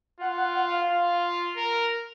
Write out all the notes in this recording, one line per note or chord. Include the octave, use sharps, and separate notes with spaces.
F4 F#5
F#5
F#5
F5
F4
A#4